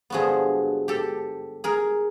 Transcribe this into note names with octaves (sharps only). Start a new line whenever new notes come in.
G2 D3 F3 G#3 B3 F#4 G#4
G4 A4
G#4 A#4